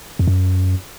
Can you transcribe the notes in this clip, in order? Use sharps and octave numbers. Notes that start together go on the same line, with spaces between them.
F2
F#2